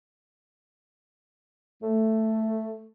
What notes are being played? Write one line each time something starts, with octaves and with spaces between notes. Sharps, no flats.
A3